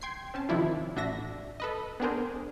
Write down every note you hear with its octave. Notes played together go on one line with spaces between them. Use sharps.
G5 C6 G#6 C7
C4 C#4 A5
C3 D#3 F3 D4 E4 F4
A1 D4 F#4 E5 A#6
A4 B4 D#5
B3 C4 D4 G#4 A#4 C5